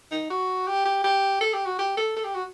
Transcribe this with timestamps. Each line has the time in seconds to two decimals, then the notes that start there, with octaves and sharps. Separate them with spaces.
0.11 D#4
0.30 F#4
0.67 G4
0.85 G4
1.04 G4
1.41 A4
1.54 G4
1.66 F#4
1.79 G4
1.97 A4
2.16 A4
2.24 G4
2.35 F#4